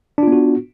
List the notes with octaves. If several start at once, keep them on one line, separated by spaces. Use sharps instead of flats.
B3 D4 F4 F#4